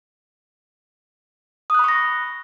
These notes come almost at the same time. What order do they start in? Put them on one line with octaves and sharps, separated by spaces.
D#6 F#6 B5 C#6 A#6